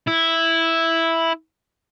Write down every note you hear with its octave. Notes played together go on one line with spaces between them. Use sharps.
E4